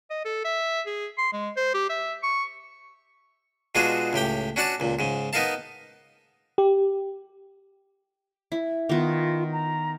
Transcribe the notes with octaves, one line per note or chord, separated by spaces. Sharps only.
D#5
A4
E5
G#4
C6
G#3
C5
G4
E5
C#6
B2 G#3 D4 F4 F#4 G#4
C#2 A2 G4 G5
C#4 D4 F#4 D5 F#5 A5
C#2 A#2
G#2 C#3
B3 D#4 A#4 F5 A5
G4
E4
D#3 B3 F4
A#5